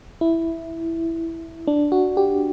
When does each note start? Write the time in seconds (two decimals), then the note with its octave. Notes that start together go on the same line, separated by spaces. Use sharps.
0.21 E4
1.67 D4
1.92 F#4
2.17 G4